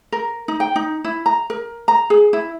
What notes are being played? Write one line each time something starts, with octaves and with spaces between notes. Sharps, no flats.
A#4
D#4
G5
D#4
E4
A#5
A#4
A#5
G#4
E4